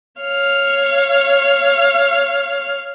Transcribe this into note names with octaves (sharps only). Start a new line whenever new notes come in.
C#5 F5